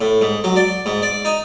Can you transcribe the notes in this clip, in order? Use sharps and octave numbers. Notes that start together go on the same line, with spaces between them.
A2
G#2
F#3
D5
G#2
D5
D#4